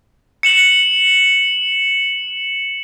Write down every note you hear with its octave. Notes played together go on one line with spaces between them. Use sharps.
C#7 E7 F#7